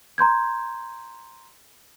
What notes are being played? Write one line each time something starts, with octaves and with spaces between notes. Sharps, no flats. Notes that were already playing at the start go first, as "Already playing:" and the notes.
A#5 C6 G6 G#6